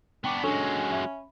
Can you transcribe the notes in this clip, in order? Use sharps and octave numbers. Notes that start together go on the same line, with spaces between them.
B3 D4 G5 C#6 D6
F#3 G#3 C#4 D4 A4 C#6
E5 B5